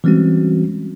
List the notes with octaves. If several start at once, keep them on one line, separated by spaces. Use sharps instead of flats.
E3 G3 G#3 C4 C#4 F#4